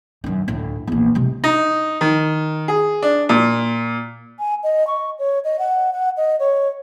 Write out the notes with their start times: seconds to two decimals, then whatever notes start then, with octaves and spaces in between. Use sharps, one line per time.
0.24 F#2 D#3
0.48 D2 A2
0.87 A#1 E2
1.15 C3 G#3
1.44 D#4
2.01 D#3
2.68 G#4
3.02 D4
3.29 A#2
4.39 G#5
4.63 D#5
4.87 C#6
5.19 C#5
5.44 D#5
5.59 F#5
5.93 F#5
6.17 D#5
6.40 C#5